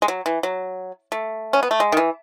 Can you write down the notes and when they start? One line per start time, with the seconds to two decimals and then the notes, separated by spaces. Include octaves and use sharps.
0.02 G#3
0.08 F#3
0.26 E3
0.43 F#3
1.12 A3
1.53 C#4
1.63 B3
1.71 A3
1.80 G#3
1.92 D#3
1.97 E3